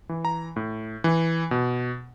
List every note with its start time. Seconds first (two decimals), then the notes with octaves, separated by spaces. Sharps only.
0.09 E3
0.25 A#5
0.56 A2
1.04 E3
1.51 B2